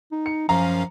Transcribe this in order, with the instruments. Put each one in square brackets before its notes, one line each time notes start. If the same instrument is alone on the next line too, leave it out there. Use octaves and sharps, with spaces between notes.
[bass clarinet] D#4
[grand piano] C#7
[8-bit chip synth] F#2 C#4 F5 [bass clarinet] F3 [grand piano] A#5